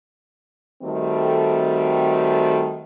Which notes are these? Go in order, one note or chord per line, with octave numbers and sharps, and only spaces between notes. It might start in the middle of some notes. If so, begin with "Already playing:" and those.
D#3 G3 A3 C4 F#4 A4